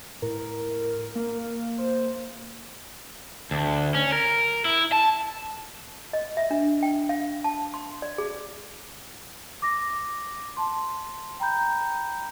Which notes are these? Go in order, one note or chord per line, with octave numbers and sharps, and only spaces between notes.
A2 A#4
A#3
C5
D2
C#4
A#4
E4
A5
D#5
E5
D4
G5
F5
A5
C6
D5
G#4
D6 A#6
A5 C6
G5 A#5 B5 G6